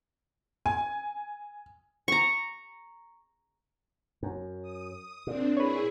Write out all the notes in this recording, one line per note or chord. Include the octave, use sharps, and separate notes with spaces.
G#5
A#5 C#6
F#2
D#6
A#2 C4 D4
E4 G#4 B4 C#5